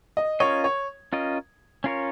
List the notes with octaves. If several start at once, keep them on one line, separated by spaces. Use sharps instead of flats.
D#5
C#4 F4 A#4 C#5 D#5
C#5
C#4 F4 A#4 D#5
C#4 F4 A#4 C#5